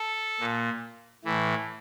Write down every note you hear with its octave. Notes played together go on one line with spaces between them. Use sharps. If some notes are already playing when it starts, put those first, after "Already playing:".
Already playing: A4
A#2
A2 E3